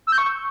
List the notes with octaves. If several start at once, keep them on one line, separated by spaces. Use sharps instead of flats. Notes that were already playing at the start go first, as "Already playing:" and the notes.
E6
G6
C#6